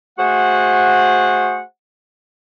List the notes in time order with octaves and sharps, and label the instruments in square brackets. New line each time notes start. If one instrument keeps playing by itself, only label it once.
[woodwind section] A3 F#4 G#4 C5 F#5